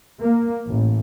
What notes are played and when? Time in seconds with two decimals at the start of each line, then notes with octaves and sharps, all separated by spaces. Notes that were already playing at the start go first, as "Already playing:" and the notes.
0.21 A#3
0.66 A1